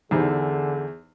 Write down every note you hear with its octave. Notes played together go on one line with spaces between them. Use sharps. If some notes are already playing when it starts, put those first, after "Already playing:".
E2 D3 D#4 G4 G#4 C5